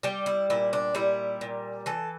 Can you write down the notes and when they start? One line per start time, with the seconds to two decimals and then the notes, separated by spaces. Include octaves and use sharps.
0.03 G3 G4
0.26 E4
0.50 A#2 E4
0.73 D4
0.95 G3 E4
1.41 A#2
1.86 E3 A4